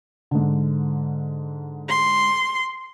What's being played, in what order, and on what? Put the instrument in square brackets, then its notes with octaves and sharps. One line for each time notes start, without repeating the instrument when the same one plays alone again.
[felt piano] G#2 D3
[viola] C6